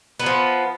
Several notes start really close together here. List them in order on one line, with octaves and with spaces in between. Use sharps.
B3 F#3 F3